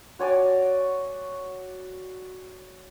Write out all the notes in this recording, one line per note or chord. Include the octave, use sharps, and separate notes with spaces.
F#4 C#5 D5 G#5